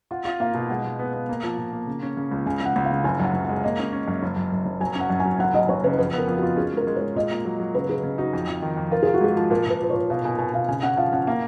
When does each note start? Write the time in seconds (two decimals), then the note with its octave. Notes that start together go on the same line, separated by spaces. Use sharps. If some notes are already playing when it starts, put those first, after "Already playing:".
0.11 F4 F#5
0.25 F4
0.40 A#3 F5
0.55 B2
0.70 G#3 F#5
0.85 G#3
0.99 B3
1.13 B3
1.29 A#3
1.43 F3
1.58 A#2
1.73 A#3
1.87 C#3
2.03 C#4
2.17 C#3
2.31 C#2
2.46 C#3 G#5
2.61 C#3 F#5
2.76 C#2
2.85 F5
2.90 C#3
3.04 F#1 G#5
3.20 F#2 F#5
3.34 F#1
3.44 F#5
3.49 G#3
3.63 A#3 D#5
3.79 C#4
3.93 C#4
4.08 F#2
4.23 F#1
4.36 F#2
4.52 F#2
4.66 F#1
4.80 F#3 G#5
4.95 C#4
5.00 F#5
5.10 F#2
5.20 G#5
5.25 F#3
5.39 F#1 F#5
5.54 F#1 D#5
5.69 F#1 C#5
5.84 C#3 B4
5.98 F2 B4
6.13 B3 A#4
6.28 F2
6.37 F#4
6.43 F4
6.57 C#4 G#4
6.72 G#3 A#4
6.87 G#3
6.96 C#5
7.01 G#3
7.15 A#2 D#5
7.31 A#3
7.45 F#3
7.60 F#3
7.74 C#3 B4
7.89 C#3 G#4
8.03 C#3
8.18 D#4 F#4
8.33 F2
8.47 F2
8.62 D#3
8.77 F2
8.91 F4 A#4
9.03 F4 G#4
9.14 F#4
9.21 G#2 G#4
9.37 F3
9.50 A#2 A#4
9.66 A#2 B4
9.81 A#2 B4
9.90 C#5
9.94 A#2
10.10 B2 F5
10.25 B2 G#5
10.38 B2 G#5
10.53 B2 F5
10.68 C#3 G#5
10.82 C#4 F#5
10.97 F3 F5
11.13 C#4 F#5
11.27 A#3 F5